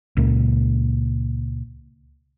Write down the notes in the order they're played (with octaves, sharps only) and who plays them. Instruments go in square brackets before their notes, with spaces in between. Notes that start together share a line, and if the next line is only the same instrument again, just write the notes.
[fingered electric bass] C#2 A#2